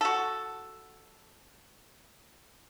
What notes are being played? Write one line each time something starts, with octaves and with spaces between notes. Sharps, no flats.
F#4 A4